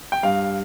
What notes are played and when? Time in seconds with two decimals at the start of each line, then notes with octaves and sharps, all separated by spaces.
0.12 G5
0.23 G2 F5